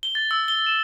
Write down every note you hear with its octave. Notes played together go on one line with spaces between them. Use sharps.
G7
A6
E6
G7
E7